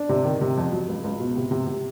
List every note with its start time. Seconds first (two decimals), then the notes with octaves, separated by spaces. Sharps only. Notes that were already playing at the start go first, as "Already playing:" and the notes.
Already playing: D4
0.09 C3
0.25 D#3
0.41 C3
0.57 F2
0.72 F#3
0.88 C#2
1.04 C#2
1.20 B2
1.36 C3
1.51 C3
1.67 C3